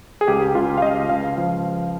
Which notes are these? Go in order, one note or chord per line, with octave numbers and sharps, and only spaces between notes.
G#4
C#2 G4
C#2 F4
F5
C#2 D#5
C#2 F5
F3